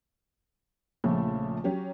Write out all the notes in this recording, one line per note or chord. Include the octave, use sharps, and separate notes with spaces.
A#1 C#3 F3 A3
F#3 C#4 G4